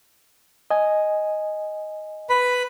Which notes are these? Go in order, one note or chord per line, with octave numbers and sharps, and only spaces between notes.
D#5 G#5
B4 B5